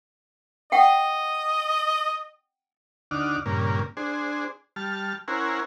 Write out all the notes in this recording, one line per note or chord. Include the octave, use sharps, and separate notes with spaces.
D#5 F#5 G5
D2 D4 D#4 F#5 D6 F6
G2 A#2 C#3 A#3
D4 G#4 C5
G3 A5 F6
C#4 E4 A#4 C5 F#5 G#5